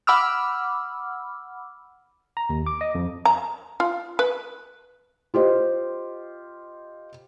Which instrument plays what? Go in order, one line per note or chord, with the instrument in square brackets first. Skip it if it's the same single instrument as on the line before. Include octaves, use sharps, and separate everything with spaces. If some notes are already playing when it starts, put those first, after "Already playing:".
[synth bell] F#5 B5 D6 E6 F6
[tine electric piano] A#5
D#2
D6
D#5
F2
[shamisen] A#5
F4
B4
[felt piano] F4 G4 C5 D#5